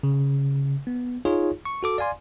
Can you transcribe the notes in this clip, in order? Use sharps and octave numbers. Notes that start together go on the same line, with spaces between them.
C#3
B3
D#4 F4 G#4 C#5
C#6
F#4 A4 D6
D5 F5 G#5 C6